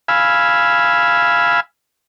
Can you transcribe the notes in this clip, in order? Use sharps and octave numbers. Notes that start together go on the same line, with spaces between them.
F5 G#5 B5 E6